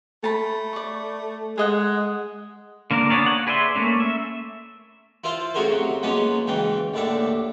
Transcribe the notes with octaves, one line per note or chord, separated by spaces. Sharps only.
A3 A5 B5
D5 C#6
G#3 G#4 D#5 F#5
D3 A#3 D4 A#4
B3 D4 G#4 C#5 D5
F#5
G#4 B4 D5 E5 C6
A3 A#3 C#4
E5
E4 F4 C5 F5 A5 C6
A3 C#4 F#4 G#4 A#4 C5
C3 F#3
F3 F#3 G#3 A#3 B3 C#4
G#2 C#3 E3 G5
A#1 D#2 A2 D3 E5 A5